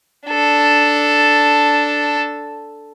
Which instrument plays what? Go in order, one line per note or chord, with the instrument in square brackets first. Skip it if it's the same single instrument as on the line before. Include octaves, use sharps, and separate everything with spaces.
[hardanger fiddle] D4 A4